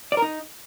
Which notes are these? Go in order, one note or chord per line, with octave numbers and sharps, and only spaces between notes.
D5
A#4
D#4